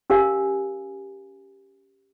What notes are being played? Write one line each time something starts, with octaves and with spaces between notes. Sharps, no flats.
C#4 G4 A#4 F5 G#5